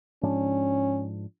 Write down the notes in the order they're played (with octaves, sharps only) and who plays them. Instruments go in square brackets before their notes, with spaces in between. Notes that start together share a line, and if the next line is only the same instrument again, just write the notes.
[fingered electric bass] G#2 F3 D4 [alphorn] C#4